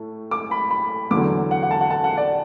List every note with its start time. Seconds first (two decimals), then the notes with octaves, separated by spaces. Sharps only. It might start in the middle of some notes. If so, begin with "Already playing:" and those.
Already playing: A2 A3
0.31 D6
0.51 B5
0.71 B5
1.11 E2 D3 F#3 D6
1.51 F#5
1.63 F#5
1.71 A5
1.81 F#5
1.91 A5
2.04 F#5
2.17 D5